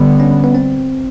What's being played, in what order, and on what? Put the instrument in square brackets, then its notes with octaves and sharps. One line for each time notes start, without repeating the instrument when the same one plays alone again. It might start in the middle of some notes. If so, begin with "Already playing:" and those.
Already playing: [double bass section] D3 G3 B3
[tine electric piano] C#4
B3
C4